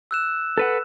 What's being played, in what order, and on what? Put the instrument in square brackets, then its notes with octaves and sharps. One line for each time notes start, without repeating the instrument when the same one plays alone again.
[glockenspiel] E6 F#6 E7
[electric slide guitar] A4 B4 F#5